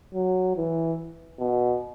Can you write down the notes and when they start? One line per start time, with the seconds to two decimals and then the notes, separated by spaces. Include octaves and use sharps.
0.14 F#3
0.57 E3
1.39 B2